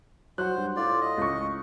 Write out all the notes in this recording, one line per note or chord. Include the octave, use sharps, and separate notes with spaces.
F#3 C5 F#5 F#6
G2
A2 F4 D5
D#5
C#2 C#6